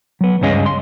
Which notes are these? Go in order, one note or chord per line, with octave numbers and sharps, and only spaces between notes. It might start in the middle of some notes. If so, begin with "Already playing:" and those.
F#3 B3
C#2 G2 C#4 G#4 D#5 F5
C6